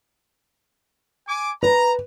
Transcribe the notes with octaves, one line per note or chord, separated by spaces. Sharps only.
G#5 D6
B4 A#5